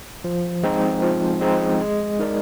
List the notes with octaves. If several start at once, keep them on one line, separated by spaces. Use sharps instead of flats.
F3
G#3 C4 D#4
F3
G#3 C4 D#4
G#3
D#4 A#4 D5